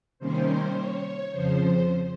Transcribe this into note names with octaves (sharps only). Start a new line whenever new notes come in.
C3 D#3 G3 A#3 C#4 C5
C#5
F2 C#3 F3 C5